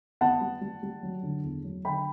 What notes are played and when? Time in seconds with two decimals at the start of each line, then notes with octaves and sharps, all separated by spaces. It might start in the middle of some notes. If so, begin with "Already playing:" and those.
0.21 B3 F#5 A5
0.41 G3
0.61 G3
0.83 G3
1.03 F#3
1.23 D3
1.44 E2
1.64 F#3
1.85 D3 G5 B5